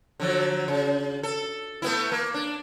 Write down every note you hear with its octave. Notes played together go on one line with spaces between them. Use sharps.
D3 F3 F#3
C#3
A4
A3 B3 E4
A#3
D4